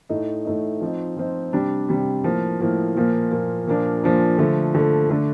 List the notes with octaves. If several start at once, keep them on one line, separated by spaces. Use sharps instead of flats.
A2 A3 D#4
A2 A3 D#4
F3 C4 D#4
F3 C4 D#4
C3 G3 D4
C3 G3 D4
A2 F3 A#3
A2 F3 A#3
A#2 F3 A#3
A#2 F3 A#3
A#2 F3 A#3 D4
A#2 F3 A#3 D4
D3 F3 A3
D3 F3 A3
D3 A3 D4